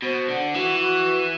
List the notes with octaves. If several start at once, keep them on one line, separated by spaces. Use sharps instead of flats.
B2 C5
D3 F#5
E3 F#4
F#4
B4